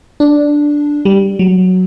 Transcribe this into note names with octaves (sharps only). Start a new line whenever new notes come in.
D4
G3
F#3